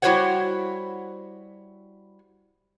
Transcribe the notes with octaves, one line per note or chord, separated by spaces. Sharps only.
G3 E4 F#4 C5 C#5 F#5